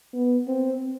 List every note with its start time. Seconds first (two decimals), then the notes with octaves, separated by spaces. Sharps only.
0.13 B3
0.48 C4